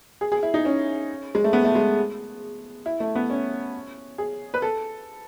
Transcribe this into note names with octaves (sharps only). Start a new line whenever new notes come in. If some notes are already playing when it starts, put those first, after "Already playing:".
G#4
G#4
E4
D#4
C#4
G#3
A3
B3
A3
G#3
E4
A3
B3
C#4
G#4
B4
A4